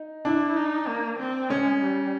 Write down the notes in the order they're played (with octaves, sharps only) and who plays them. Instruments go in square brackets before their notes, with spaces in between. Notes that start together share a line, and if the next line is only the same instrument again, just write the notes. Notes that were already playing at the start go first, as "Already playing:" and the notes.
Already playing: [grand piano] D#4
[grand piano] D4 [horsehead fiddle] E4
[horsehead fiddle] D#4
A#3
C4
[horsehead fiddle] G#3 [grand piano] C#4
[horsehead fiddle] G3